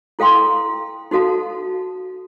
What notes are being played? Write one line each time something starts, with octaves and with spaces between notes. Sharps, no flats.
E4 A4 F5 G5 C6
D#4 F#4 A4 F5 A5